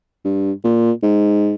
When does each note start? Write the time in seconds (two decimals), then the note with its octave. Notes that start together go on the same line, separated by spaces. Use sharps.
0.25 G2
0.64 A#2
1.03 G#2